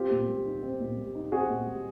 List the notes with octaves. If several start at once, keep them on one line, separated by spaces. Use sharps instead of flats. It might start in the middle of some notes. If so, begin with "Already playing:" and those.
Already playing: C4 F4 G4
A#2
G3
D#4
C4
A#2
G3
D#4
C4 F#4 G#4
A#2
G3